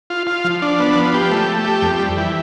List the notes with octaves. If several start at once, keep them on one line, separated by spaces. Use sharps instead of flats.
F4
F4
F3
D4
B3
F3
G4
A3
A3
G4
F2
G3
E3